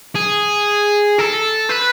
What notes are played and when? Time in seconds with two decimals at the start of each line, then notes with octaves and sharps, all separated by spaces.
0.16 G#4
1.19 A4
1.70 B4